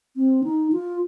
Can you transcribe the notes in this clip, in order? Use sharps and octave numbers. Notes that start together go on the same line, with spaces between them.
C4
D#4
F4